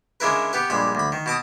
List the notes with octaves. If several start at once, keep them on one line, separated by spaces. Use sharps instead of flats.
C#3 G#3 D4 E4 A#4 B4
B3 G4 B4
A#1 G2 G#3 B5
D2 B5
D#3
B2 A5 D6 D#6